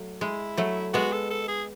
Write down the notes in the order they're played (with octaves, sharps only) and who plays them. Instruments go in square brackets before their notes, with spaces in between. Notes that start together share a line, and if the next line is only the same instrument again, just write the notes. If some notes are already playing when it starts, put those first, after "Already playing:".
Already playing: [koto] F#3 A3
[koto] G#3 [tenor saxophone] E4
[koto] F#3 A3
[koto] G#3 B3 [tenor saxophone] F#4
[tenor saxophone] A4
A4
G#4